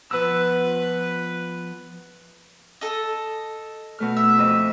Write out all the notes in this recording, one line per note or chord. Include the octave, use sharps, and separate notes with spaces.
F3 B3 B4 E6
A4 D#5
B2 A3 F6
E5
F2 D#5